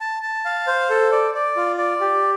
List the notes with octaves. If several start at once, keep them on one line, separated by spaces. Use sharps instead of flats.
A5
A5
F5
C5
A4
D5
D5
F4
D5
G4